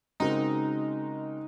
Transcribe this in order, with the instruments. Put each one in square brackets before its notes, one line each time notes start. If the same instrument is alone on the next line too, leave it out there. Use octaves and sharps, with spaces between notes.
[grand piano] C#3 G#3 C4 F#4 A#4 [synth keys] D#4